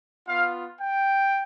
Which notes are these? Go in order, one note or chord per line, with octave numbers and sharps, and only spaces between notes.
B3 F4 F5
G5